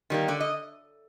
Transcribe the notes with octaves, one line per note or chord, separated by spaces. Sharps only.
D#3 G3 A#3
D3 D5
D#5